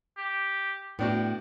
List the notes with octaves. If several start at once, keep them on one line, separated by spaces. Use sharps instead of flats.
G4
A2 B3 D4 F#4 G5